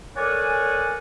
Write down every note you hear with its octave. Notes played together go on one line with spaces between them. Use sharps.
A4 A#4 C#5 D5 F#5 G#5